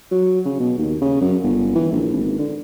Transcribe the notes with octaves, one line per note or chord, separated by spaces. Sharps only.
F#3
C#3
B2
D#2
C#3
F#2
G1
E3
A#1
G#1
D3